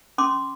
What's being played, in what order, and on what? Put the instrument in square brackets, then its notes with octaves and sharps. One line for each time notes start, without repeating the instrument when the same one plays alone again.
[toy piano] C#4 C6 D6